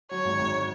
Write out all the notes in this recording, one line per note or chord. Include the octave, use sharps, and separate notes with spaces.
F#3 C#5
G#1
G#1